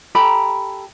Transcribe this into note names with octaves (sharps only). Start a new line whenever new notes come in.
G4 A4 A#5 B5